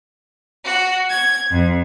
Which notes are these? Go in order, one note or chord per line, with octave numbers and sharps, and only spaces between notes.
F#4
G#6
F2